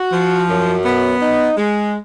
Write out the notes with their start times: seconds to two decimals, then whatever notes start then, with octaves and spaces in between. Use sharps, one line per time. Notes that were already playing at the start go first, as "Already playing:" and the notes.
Already playing: F#4
0.12 F3
0.48 F#2
0.84 B3
1.21 D#4
1.56 G#3